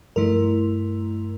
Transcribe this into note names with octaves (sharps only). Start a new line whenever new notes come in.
G2 F3 A3 E4 A#4